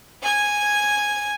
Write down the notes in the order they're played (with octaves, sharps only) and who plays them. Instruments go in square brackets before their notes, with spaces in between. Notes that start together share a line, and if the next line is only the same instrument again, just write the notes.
[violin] G#5 G#6